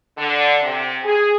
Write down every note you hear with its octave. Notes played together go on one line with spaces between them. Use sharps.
D3
C3
G#4